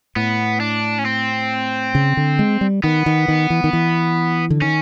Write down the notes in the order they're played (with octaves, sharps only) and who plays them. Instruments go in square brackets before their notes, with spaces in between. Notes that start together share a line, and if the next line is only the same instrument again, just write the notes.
[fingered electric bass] A2 [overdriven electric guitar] B3
[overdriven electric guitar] D4
C#4
C4
[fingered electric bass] C#3
D3
G#3
G3
[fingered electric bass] D#3 [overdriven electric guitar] B3
[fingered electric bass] D#3
D#3
E3
D#3
E3
D3
[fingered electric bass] D#3 [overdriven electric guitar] C#4